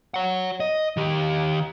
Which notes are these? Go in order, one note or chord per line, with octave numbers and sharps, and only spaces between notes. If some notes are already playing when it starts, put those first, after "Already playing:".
C#5 F#5
D#5
D#3 G4